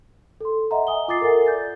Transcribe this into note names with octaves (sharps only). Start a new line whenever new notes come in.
A4 C6
D#5 E5 F#5 A#5
G#5 D#6 G7
F4 D6 D#6 A6 C7
A4 A#4 E5 F#5 G#5
D5 G6 A6